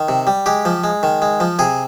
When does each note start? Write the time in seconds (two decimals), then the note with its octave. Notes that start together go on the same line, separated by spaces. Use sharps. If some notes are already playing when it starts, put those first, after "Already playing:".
Already playing: D#3
0.09 C3
0.27 G3
0.46 G#3 G4
0.65 F3
0.84 G#3
1.03 D#3
1.22 G#3
1.40 F3
1.59 C3 G#4